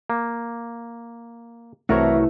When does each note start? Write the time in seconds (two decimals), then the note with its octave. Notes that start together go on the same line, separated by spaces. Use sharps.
0.10 A#3
1.89 C2 E3 A3 F#4 A#4 C#5